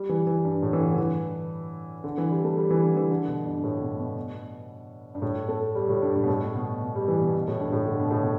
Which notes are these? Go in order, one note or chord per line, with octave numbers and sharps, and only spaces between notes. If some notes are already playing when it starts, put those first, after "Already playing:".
Already playing: G3
E3
E3
G2
A2
E3
D3
D3
E3
D3
E3
G3
A3
G3
E3
D3
E3
D3
B2
G2
A2
B2
B2
G2
A2
A3
G3
A2
G2
A2
B2
A2
B2
B2
G3
E3
B2
B2
A2
G2
A2
D3
B2
A2
B2